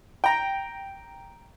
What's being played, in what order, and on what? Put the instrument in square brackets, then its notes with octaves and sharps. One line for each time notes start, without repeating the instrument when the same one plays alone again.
[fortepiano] G5 A#5